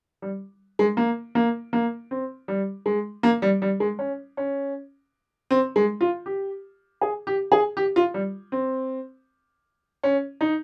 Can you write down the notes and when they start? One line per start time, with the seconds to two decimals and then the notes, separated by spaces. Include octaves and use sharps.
0.22 G3
0.79 G#3
0.97 A#3
1.35 A#3
1.73 A#3
2.11 C4
2.48 G3
2.86 G#3
3.23 A#3
3.42 G3
3.62 G3
3.80 G#3
3.99 C#4
4.37 C#4
5.51 C4
5.76 G#3
6.01 F4
6.26 G4
7.01 G#4
7.27 G4
7.52 G#4
7.77 G4
7.96 F4
8.14 G3
8.52 C4
10.03 C#4
10.41 D#4